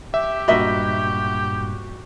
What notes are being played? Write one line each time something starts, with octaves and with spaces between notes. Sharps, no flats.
G4 E5
G2 A#2 F#4 A#4 D#5 E5 B5